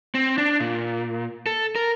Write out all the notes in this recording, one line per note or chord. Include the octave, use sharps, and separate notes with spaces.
C4
D4
A#2
A4
A#4